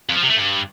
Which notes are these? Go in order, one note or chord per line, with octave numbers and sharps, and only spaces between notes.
F2
F3
C3
A3
G2